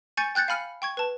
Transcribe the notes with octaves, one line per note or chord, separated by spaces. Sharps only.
G#5 C#6 G6 A6 C#7
G5 F#6 G6 A6 C#7
F5 G#5 B5 F6 C#7 F#7
G5 C#6 G#6
B4 A5